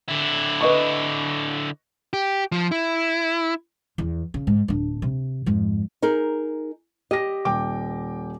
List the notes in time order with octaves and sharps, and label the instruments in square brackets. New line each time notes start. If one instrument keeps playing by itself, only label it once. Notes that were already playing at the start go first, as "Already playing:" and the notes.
[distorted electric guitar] D3 E4
[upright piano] B4 D#5 C#6
[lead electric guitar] G4
F3
E4
[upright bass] E2
C#3
G#2
D1 D4
C3
F2 G#2
[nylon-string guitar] D#4 G#4 A#4
[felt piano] G4 A#6 [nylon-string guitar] D#5
[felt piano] D#1 G5 D6